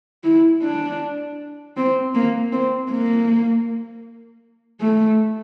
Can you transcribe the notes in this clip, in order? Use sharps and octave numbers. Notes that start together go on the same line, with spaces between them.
E4
D4
C4
A#3
C4
A#3
A3